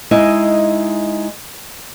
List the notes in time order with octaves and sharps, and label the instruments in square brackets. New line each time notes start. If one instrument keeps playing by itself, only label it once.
[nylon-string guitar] G#3 D#4 E4 D#5